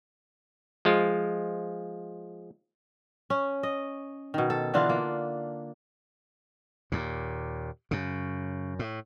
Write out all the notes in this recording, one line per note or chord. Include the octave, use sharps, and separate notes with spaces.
F3 G#3 F4
C#4
D#5
B2 D#3
A4
D3 E3 D4 F4
A#3
D#2 A#2
F#2 C#3
A2